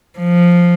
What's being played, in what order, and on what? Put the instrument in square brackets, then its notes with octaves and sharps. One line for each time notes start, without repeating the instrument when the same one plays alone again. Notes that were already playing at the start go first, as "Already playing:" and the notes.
[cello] F3